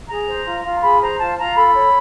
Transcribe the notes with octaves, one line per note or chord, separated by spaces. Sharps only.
G#4 A#5
C5
F4
F4
G#4 B5
C5 A#5
F4 A5
F4 A#5
A4 B5
C#5